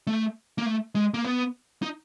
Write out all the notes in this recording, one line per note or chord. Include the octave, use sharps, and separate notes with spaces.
A3
A#3
A3
G#3
A#3
B3
D#4